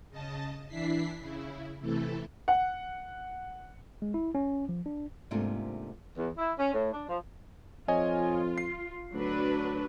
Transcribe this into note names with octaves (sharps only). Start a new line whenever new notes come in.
C#3 D#5 A5
E3 D4 E4 B6 C7
C#3 E4
C3 E3 A3 E4 A4
F#5
G#3
E4
C#4
F3
D4
G#2 C3 A3 A#3 D4 F4
E2
E4
C#4
A2
D4
F3
F2 F4 C#5 D#5 G#5
C7
D2 F#3 D4 B4